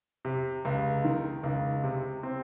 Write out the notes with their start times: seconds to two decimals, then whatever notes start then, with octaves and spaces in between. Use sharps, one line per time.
0.25 C3
0.65 C#2
1.04 D#3
1.43 C#2
1.84 C3
2.23 C4